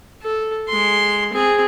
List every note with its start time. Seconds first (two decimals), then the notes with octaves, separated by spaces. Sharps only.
0.23 A4
0.68 G#3 C6
1.33 C4 G#4